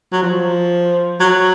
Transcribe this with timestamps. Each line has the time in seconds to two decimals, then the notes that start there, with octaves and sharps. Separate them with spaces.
0.12 F#3
0.23 F3
1.20 F#3